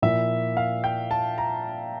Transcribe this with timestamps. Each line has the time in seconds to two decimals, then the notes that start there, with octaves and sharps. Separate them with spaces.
0.02 A#2 F3 A#3 E4 E5
0.57 F5
0.84 G5
1.11 A5
1.38 A#5